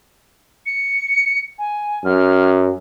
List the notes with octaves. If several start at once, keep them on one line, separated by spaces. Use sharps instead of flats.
C#7
G#5
F#2 F6